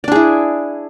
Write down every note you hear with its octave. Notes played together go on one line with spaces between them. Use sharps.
D4 E4 G#4 D5